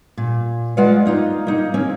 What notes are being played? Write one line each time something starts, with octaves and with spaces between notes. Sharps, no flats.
A#2
G#3 F4 B4 D5 F5 F#5
A#3 D#4 F4
A#3 D#4
A#3 C4 C#4